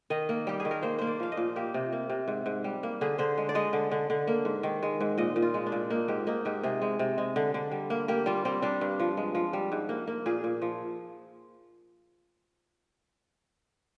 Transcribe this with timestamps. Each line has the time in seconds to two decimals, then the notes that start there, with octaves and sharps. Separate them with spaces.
0.10 D#3 D#5
0.29 A#3
0.47 G3 G4
0.60 G#4
0.65 D#3
0.71 A#4
0.82 A#3 C5
0.98 A#3 C5
1.07 D5
1.20 F3 F5
1.32 D#5
1.37 A#2
1.56 A#3 G4
1.74 C3
1.92 A#3
2.09 C3
2.28 G#2
2.46 G#2
2.64 G3
2.83 A#3
3.01 D3 G#4
3.18 D3 C5
3.38 G#3
3.49 D5
3.55 G#3 D#5
3.73 D3
3.92 D3
4.10 D3
4.27 A#3
4.45 G#2
4.63 D#3
4.83 G#3
5.00 G#2
5.18 A#2 D#5
5.36 A#2
5.42 F4
5.54 G#3
5.66 D4
5.72 A#2
5.90 A#3 D#4
6.08 G#2 G4
6.27 A#3 D#4
6.45 G#2 G4
6.63 C3 G#4
6.82 G#3
6.99 C3
7.18 G#3
7.36 D3
7.54 D3
7.71 G3
7.90 A#3
8.08 A#3 G4
8.26 G3 F4
8.45 G3 C4
8.62 G3 D4
8.81 G2
9.00 F3
9.17 G#3
9.35 F3
9.53 G3
9.72 G#2
9.89 A#3
10.07 A#3
10.26 A#2 G#4
10.44 A#2
10.62 F3